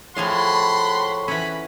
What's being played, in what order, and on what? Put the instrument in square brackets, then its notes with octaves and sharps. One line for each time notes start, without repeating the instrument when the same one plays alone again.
[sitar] A2 [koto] F3 G#4 F5 [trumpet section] F#5 B5 C6
[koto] E3 C#4 [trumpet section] F#5 B5